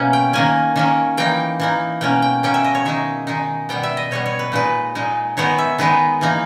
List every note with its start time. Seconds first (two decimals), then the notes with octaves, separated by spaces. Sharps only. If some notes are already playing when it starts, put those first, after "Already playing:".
Already playing: B2 A#3 C#4 E5
0.13 G5
0.33 D#3 A#3 C#4 G#5
0.76 D#3 A#3 C#4
1.17 E3 A#3 D#4 G5
1.60 E3 A#3 D#4
2.01 B2 A#3 C#4 G5
2.22 G5
2.43 B2 A#3 C#4 G5
2.54 E5
2.64 D#5
2.75 C#5
2.85 D#3 G#3 D#4 E5
3.27 D#3 G#3 D#4
3.69 B2 G3 B3 G5
3.83 E5
3.97 D#5
4.11 B2 G3 B3 C#5
4.26 C#5
4.39 B4
4.52 A#2 G#3 D#4 B4
4.95 A#2 G#3 D#4
5.37 D#3 G#3 B3 D#4 C#5
5.58 E5
5.78 D#3 G#3 B3 D#4 B4
6.21 E3 A#3 D#4